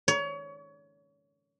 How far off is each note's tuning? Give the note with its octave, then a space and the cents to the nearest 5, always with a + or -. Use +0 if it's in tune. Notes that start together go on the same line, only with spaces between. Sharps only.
C#5 +30